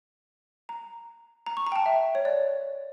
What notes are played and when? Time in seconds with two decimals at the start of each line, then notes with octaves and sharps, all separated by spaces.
0.69 A#5
1.46 A#5
1.57 C#6
1.67 A#5
1.72 G5
1.76 A5
1.86 E5
2.15 C#5
2.25 D5